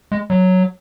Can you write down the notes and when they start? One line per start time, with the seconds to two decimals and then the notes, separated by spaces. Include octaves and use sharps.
0.12 G#3
0.30 F#3